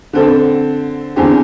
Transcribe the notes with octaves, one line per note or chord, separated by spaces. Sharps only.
D3 C4 A4
E2 D3 C4 G4